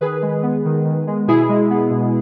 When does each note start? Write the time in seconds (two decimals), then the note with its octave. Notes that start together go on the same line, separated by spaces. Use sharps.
0.01 D#3 G#4 B4
0.22 G#3
0.43 B3
0.65 D#3
0.85 D#3
1.07 G#3
1.28 B2 E4 G#4
1.49 G#3
1.70 B3
1.91 B2